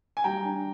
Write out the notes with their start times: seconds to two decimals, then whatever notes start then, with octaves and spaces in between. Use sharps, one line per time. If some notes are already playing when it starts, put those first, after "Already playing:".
0.17 G#5
0.24 G3 G5 A#5
0.44 D4